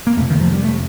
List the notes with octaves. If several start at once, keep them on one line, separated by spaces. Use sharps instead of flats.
A#3
F2 C3 A3
D#3
F3
G3
A3